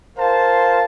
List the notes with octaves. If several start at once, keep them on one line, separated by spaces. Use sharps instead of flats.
F4 A#4 C5 F5 A5